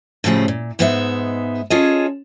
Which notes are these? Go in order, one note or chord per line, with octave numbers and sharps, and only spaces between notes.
A2 C#3 F3 G3 A3 G#4
A#2
G#2 G#3 B3 D#4 G4 E5
C#4 F4 G#4 A4 C#5 D#5